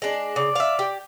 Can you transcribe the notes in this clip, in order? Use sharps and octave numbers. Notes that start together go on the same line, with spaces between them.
G#3 D4
C#3 D5
E5 F5
G4